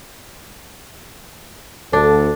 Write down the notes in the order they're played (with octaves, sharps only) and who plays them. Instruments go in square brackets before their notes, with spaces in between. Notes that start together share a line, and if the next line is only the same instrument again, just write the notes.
[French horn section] D2 A4 [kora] D4